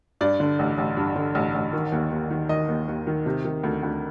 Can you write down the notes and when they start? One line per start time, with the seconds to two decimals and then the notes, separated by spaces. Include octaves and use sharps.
0.21 G2 D5
0.40 D3
0.59 A1
0.78 A1
0.97 G2
1.16 D3
1.35 A1
1.54 A1
1.73 D#3
1.92 D#2
2.11 D#2
2.30 D#3
2.49 D#3 D#5
2.68 D#2
2.88 D#2
3.07 D#3
3.26 C3
3.45 D#3
3.63 D2
3.83 D2